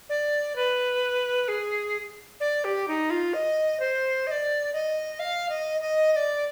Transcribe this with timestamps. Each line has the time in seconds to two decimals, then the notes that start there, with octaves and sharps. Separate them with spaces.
0.09 D5
0.56 B4
1.48 G#4
2.40 D5
2.64 G4
2.88 D#4
3.10 F4
3.34 D#5
3.80 C5
4.27 D#5
4.31 D5
4.73 D#5
5.19 F5
5.49 D#5
5.81 D#5
6.12 D#5
6.16 D5